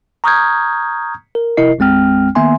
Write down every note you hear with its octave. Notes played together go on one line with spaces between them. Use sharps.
A#5 C#6 D#6 F6 G6 G#6
A#4
G1 C3 E4 A#4 D#5 C7
A1 F2 G#3 C4 G5 F6
D#3 A#3 B3 E5 G#5 C6